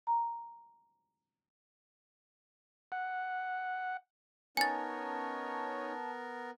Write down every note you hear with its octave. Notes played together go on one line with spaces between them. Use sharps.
A#5
F#5
B3 C#4 D#4 A#4 C#5 G#5 A5 A6